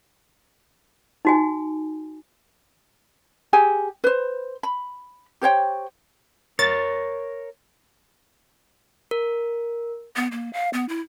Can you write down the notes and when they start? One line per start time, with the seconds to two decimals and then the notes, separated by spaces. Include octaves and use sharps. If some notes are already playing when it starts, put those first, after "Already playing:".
1.25 D#4 F#4 G#5
3.53 G4 G#4 G#5
4.04 B4 C5
4.63 B5
5.42 G4 C5 C#5 G5
6.59 A#4 C#5 A6
9.11 A#4
10.16 B3
10.32 A#3
10.53 F5
10.73 B3
10.89 E4